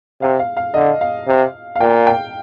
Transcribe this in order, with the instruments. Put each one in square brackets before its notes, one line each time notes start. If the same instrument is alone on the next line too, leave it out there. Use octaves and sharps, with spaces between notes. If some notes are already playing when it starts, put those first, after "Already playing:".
[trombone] C3 [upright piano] F5
[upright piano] F5
F5
[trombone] D3 [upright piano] D#5
[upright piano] F5
[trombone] C3
[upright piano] F5
[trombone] A#2 [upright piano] G5
[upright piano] G5